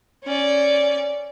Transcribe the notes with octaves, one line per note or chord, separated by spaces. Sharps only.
C#4 D5